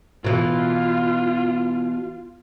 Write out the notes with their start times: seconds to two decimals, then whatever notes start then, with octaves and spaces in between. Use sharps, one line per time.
0.24 B2 E3 F4